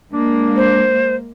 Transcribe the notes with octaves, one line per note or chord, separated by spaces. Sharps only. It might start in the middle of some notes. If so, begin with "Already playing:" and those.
G#3 A#3 D4
C5